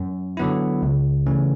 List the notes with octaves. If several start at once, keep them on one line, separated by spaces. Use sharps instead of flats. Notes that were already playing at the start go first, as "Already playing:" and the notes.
Already playing: F#2
D3 F#3 B3 E4
C#2
C#3 E3 A3 C#4